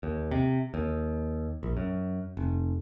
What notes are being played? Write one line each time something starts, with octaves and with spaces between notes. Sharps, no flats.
D#2
C3
D#2
A#1
F#2
F1